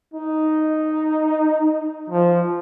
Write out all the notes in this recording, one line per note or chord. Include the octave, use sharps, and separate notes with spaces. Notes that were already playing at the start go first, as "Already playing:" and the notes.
D#4
F3